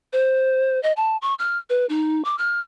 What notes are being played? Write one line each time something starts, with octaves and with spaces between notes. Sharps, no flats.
C5
D#5
A5
C#6
F6
B4
D#4
D6
F6